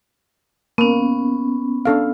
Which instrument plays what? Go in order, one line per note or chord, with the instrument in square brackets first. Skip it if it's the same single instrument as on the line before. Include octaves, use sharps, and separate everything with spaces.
[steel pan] A#3 [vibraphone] B3 C#4
[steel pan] D4 A4 F5